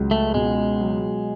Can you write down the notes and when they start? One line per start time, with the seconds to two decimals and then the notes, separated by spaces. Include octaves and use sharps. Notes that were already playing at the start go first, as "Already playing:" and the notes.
Already playing: C#2 F#3
0.11 A3
0.34 B2 G#3
0.80 F#3